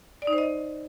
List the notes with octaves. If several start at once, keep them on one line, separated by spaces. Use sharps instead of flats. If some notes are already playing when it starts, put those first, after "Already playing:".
D5
D#4
C5
D#5